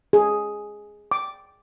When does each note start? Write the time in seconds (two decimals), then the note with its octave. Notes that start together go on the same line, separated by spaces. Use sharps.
0.13 G#4
1.11 D6